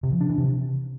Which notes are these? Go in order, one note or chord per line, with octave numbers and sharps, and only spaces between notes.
C3
F3
D4
E3
C3